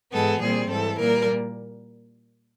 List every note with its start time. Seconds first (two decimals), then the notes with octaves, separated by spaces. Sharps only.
0.12 G#2 E3 G#3 B3 A4
0.41 A#2 G3 C4 G#4
0.70 G#2 E3 G3 A4
0.99 A#2 G3 A#3 A#4